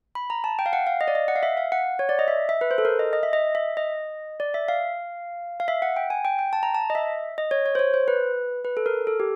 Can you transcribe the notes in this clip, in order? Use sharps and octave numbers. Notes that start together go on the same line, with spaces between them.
B5
A#5
A5
G5
F5
F#5
F5
D#5
D5
D#5
F#5
F5
E5
F5
F#5
C#5
D5
D#5
E5
E5
B4
C5
A4
A#4
D#5
D#5
E5
D#5
E5
D#5
D5
E5
F5
F5
E5
F#5
G5
G#5
G5
G5
A5
A#5
A5
D#5
E5
D#5
C#5
C#5
C5
C#5
C5
B4
B4
A4
A#4
A4
G4